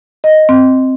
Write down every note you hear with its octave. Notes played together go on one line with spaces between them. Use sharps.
D#5
C4